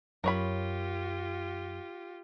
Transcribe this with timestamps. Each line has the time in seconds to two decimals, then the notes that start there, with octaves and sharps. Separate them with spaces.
0.24 F#2 F4 G4 A#4 C#5 B5